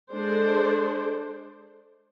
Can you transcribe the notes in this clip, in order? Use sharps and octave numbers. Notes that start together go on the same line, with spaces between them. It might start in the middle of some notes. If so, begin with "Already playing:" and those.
G#3 D4 A4 C5